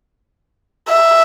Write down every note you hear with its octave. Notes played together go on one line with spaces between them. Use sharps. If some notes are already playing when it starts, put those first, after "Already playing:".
E5